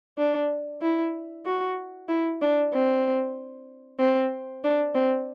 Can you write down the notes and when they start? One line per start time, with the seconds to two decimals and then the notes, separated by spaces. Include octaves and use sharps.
0.18 D4
0.82 E4
1.46 F#4
2.08 E4
2.41 D4
2.73 C4
3.99 C4
4.64 D4
4.95 C4